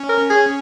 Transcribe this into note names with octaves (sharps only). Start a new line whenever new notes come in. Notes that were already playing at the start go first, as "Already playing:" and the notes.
Already playing: C#4
A#4
G#4